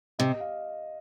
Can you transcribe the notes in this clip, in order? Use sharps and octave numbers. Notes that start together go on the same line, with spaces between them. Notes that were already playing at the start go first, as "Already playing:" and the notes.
C3 D#5
F5